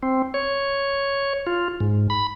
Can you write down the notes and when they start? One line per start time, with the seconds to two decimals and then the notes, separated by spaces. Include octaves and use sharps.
0.03 C4
0.34 C#5
1.47 F4
1.80 G#2
2.10 B5